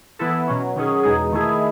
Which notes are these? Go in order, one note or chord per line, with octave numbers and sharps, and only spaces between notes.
E3 B3 E4 A4
B2 F#3 C#4
D#3 F#3 C#4 G#4
E2 B2 G#3 D#4 G#4
D#3 A3 E4 G#4